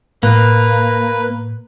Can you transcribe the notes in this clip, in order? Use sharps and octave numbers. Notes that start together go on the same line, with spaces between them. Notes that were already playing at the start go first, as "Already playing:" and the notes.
A2 A#3 B4